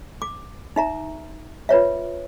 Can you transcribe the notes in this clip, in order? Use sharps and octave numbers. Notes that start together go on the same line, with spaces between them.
D6
D#4 E5 A#5
F4 B4 C#5 E5